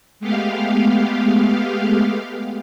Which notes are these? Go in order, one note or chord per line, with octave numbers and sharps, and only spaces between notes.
G#3 A3 B3 G4 F5